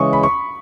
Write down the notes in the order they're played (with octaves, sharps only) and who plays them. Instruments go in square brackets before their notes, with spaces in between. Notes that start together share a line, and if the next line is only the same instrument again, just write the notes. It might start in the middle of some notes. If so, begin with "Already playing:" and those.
Already playing: [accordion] C#3 E3 G#3 [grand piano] C#6 D#6
[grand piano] B5
C#6